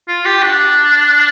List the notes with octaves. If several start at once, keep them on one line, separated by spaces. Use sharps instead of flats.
F4
G4
D4